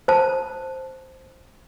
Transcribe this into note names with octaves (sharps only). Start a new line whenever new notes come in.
C5 A5